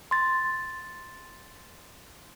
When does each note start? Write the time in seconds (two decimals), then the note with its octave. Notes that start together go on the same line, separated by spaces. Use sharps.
0.11 C6 A6